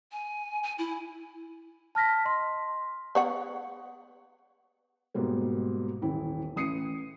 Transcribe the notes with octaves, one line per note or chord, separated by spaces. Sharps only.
G#5
G#5
E4
A5 F6 A#6 B6
D#5 C6
B3 C#5 F#5
G#2 B2 G3 A#3
D#1 E3 E4
A1 D#6 C7 C#7 D#7